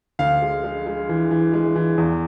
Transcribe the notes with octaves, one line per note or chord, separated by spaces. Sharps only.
D2 F5
G#3
G#3
G#3
E3
E3
G#3
E3
E2